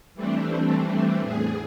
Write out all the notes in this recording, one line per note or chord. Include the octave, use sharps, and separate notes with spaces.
E3 G3 A3 C4 D4
E2 A2 G#4